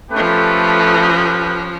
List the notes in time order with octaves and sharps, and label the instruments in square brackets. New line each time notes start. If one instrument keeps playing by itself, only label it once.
[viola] F3 C#4 [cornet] A3 [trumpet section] G4 A4 B4